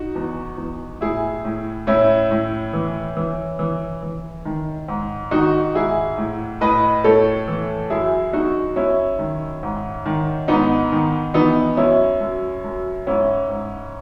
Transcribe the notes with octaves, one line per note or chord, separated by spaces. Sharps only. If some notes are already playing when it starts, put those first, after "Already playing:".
Already playing: D#4 F#4
E2
E2
A2 E4 G#4
A2
A2 C#4 E4
A2
E3
E3
E3
E3
D#3
G#2
D#3 D#4 F#4
G#2 E4 G#4
A2
A2 B4 D#5
A2 A4 C#5
E3
F#2 E4 G#4
F#2 D#4 F#4
F#2 C#4 E4
D#3
G#2
D#3
G#2 B3 D#4
D#3
E3 B3 D#4
F#2 C#4 E4
F#2
F#2
G#2 C#4 E4
G#2